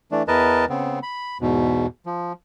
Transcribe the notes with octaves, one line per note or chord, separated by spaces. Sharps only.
E3 A3 D4
E2 E3 A#4 B4 D#5 A5
C#3 B3 C4
B5
E2 G#2 B2
F3